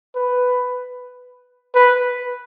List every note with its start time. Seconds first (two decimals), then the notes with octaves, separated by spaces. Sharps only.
0.15 B4
1.75 B4